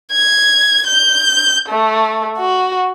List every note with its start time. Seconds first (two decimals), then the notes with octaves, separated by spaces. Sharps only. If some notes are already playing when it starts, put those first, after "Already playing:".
0.12 G#6
0.87 G6
1.69 A3
2.38 F#4